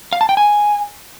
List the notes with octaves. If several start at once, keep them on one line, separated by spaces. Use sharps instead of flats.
F5
A5
G5
G#5